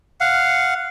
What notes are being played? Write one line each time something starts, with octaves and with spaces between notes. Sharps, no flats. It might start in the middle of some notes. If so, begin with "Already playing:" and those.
F5 F#5